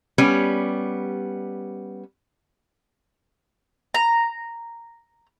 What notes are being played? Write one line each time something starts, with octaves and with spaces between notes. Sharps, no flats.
G3 B3 C#4
A#5